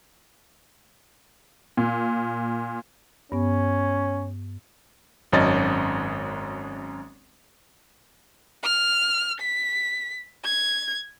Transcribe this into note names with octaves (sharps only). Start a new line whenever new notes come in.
A#2
G2 B3 C#4
G#1 F#2 C#4 D#5 A6
F6
B6
G#6